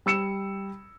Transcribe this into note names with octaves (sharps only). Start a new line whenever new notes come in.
G3 E6 C#7 E7